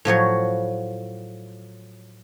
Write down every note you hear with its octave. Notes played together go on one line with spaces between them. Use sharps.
A2 F3 F#3 C#5